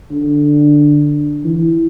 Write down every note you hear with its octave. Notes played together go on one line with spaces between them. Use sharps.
D3
E3